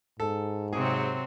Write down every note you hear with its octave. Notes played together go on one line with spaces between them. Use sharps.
G#2 A4
C3 F#3 C4 G#4